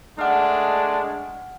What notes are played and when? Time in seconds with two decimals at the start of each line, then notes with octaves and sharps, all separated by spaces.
0.19 G#3 A3 D4 F#5 F6